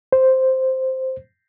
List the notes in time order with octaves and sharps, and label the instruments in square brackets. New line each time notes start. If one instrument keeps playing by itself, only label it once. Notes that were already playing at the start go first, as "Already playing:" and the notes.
[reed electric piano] C5